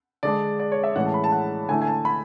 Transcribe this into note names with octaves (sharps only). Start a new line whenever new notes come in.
D3 G#3 D4 D5
D5
C#5
E5
A2 E3 G#3 C#4 F#5
A5
B5
A5
F#5
D3 A3 E4 G#5
G#5
A5
B5